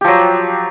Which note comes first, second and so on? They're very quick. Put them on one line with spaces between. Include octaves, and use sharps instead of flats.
G4 F3 F#3